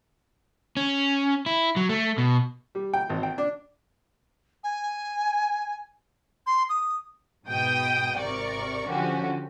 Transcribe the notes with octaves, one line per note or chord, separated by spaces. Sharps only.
C#4
E4
F#3
A3
B2
G3
G5
G#1
G5
D4
G#5
C6
D#6
G#2 B2 G5 D#6
G#1 C3 A#4 D5 C#6
D3 F3 C#4 F#4 G4